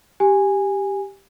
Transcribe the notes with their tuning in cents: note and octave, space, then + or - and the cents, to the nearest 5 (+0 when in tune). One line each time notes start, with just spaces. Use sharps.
G4 +0 G#5 -10